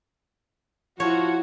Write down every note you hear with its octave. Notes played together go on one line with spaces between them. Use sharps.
F3 E4 F#4 C#5